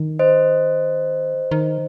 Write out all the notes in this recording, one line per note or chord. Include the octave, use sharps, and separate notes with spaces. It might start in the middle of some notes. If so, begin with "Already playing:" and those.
Already playing: D#3
C5 D#5
D#3